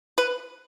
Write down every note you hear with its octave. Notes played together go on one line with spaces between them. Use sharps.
B4